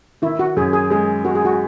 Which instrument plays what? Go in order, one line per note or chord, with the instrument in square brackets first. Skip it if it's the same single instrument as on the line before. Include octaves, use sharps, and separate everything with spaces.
[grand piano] D#3 [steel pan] E4
[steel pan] F#4
[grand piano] F#2 [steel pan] G#4
[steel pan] G#4
[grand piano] G#3 [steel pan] G#4
[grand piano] G#3 [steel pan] F#4
[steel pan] G#4
F#4